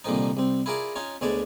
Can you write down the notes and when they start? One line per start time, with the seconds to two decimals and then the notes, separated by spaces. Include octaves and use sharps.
0.04 C2 A#2 D3 D#3 F3 D#4
0.37 C2 C4
0.66 E4 F4 G#4 A#4 D5 D6
0.96 C#4 D#4 F4 C#5
1.21 D2 B2 G#3 C#5 D5 A5